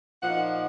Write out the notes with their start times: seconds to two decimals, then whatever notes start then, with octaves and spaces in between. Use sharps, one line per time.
0.22 A#2 F3 A#3 D#4 F#5